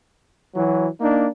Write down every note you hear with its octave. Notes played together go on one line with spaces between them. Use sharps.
E3 F#3
A#3 D4 D#4